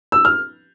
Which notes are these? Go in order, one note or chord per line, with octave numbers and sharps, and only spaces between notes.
E6
F6